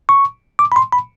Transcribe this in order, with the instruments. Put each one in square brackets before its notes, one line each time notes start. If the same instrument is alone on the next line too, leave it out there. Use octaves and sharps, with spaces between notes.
[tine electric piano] C#6
D6
B5
C6
B5